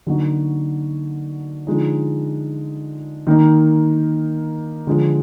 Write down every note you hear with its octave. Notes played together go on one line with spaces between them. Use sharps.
D3 F#3 A#3 D#4 F#4
D3 F3 G#3 D#4
D#3 A#3 D#4
D3 F3 G#3